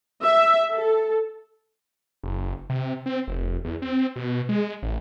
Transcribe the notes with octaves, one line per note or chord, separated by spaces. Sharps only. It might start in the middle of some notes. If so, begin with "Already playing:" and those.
E5
A4
F#1
C3
C4
F1
E2
C4
B2
G#3
A1